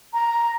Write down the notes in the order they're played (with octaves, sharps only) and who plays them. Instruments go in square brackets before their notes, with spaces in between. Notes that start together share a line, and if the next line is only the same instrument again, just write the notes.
[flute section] A#5